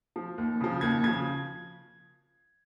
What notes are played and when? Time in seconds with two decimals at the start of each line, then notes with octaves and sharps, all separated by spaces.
0.16 F3
0.38 D#2
0.60 C#3 F3
0.81 D#2 G#6
1.03 C#3 G#6
1.08 F3